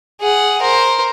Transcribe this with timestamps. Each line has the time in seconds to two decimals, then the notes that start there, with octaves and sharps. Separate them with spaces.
0.21 G#4 F#5
0.61 A#4 C5